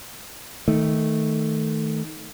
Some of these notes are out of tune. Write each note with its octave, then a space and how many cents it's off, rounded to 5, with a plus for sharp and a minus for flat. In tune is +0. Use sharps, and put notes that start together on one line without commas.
D#3 +15 A3 +0